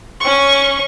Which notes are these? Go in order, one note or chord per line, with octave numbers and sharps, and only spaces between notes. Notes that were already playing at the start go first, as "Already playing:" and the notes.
C#4 C#6